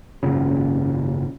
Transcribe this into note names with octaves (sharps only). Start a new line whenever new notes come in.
G#1 F#2 A#2 C#3